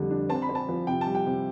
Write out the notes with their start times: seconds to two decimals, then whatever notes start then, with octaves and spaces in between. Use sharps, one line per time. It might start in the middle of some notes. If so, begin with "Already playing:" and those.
Already playing: F2 D3 G3
0.11 D4
0.29 C4 A5
0.42 B5
0.49 C4
0.55 A5
0.68 F3
0.87 C3 G5
1.01 A5
1.06 G3
1.15 G5
1.26 C3